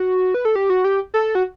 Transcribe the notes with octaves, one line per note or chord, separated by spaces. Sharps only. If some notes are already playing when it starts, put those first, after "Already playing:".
Already playing: F#4
B4
A4
G4
F#4
G4
A4
F#4